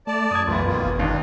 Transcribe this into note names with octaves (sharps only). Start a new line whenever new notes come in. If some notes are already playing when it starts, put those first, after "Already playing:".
A3 D5 A5
F#2 D#6 G#6
E1 E3 A3 B3 F4
D#3 A#3 F4
G1
D#2 D4